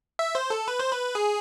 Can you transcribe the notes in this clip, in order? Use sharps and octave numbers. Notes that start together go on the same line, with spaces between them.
E5
C5
A4
B4
C5
B4
G#4